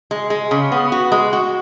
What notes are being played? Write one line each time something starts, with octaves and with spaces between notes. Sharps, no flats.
G#3
G#3
C#3
B3
F#4
G#3
F#4